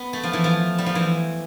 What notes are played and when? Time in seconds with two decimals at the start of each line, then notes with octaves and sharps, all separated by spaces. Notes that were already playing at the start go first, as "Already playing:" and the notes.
Already playing: B3
0.13 A3
0.23 F3
0.33 E3
0.44 F3
0.78 G3
0.86 F3
0.95 E3